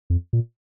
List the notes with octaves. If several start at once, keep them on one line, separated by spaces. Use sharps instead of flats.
F2
A#2